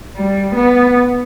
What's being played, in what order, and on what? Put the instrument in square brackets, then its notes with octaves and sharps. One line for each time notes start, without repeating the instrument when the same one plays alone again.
[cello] G3
B3